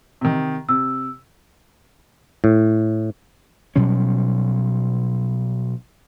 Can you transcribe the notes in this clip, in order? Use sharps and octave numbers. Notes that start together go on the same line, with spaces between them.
C3 D#3
C3 E6
A2
B2 F#3 G3 C#4